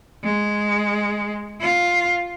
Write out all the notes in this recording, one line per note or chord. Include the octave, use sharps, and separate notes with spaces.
G#3
F4